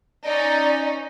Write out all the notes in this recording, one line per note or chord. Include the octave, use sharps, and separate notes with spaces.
C#4 D#4 D5